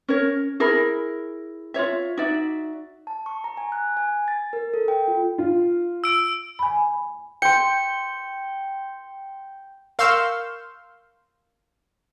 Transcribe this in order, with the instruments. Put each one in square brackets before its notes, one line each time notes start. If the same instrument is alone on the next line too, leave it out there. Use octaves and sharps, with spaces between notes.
[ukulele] C#4 A#4 C#5
E4 G#4 A#4 B5
F4 G4 C#5 E5
D#4 F#4 D5 E5
[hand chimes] A5
C#6
A#5
G#5
F#6
G#5
A6
A#4
A4
G5
F4
[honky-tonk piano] F4
[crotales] E6 D7
[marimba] G#5 B5
[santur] G5 C6 [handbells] C#7
[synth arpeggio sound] A#4 F5 C6 C#6 E6 G6